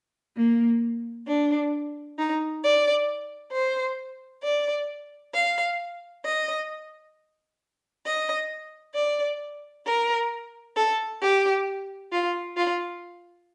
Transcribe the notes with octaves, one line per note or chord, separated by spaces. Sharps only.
A#3
D4
D#4
D5
C5
D5
F5
D#5
D#5
D5
A#4
A4
G4
F4
F4